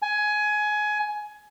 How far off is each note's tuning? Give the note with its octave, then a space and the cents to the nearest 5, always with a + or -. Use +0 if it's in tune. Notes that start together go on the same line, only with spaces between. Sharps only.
G#5 +20